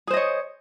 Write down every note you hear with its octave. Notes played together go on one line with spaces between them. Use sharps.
G#4 C5 C#5 D#5